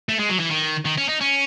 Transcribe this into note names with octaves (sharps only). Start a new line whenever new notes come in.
A3
G#3
F#3
E3
D#3
D#3
C#4
D#4
C#4